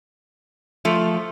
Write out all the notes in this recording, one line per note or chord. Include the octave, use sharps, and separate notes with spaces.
F3 A3